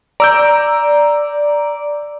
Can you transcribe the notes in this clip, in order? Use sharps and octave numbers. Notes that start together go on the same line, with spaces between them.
D5 A#5 E6 G6